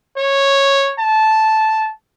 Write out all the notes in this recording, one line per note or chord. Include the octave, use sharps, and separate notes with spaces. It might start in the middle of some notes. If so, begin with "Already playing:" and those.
C#5
A5